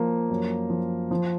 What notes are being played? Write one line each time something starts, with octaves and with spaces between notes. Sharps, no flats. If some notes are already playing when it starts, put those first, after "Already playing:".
Already playing: F3 A#3
F#2
F3
F3